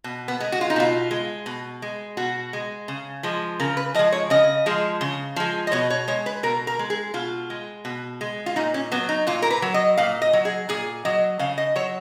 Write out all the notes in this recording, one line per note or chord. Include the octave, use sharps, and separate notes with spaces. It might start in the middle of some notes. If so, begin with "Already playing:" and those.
B2
B3
G#3
F#4
F4
D#4
B2 F4
G#3
B2
G#3
B2 F#4
G#3
C#3
F3 G#3
C#3 A#4
B4
F3 G#3 D#5
C#5
C#3 D#5
F3 G#3
C#3
F3 G#3
D#5
B2 C#5
C#5
G#3 C#5
B4
B2 A#4
A#4
G#3
G#4
B2 F4
G#3
B2
G#3
F4
A#2 D#4
C#4
F#3 B3
D#4
A#2 F4
A#4
B4
F#3
D#5
A#2 F5
D#5
F#3
G#4
A#2 G#4
F#3 D#5
C#3 F5
D#5
F#3 C#5